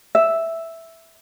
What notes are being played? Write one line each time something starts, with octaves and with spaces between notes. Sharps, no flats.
E5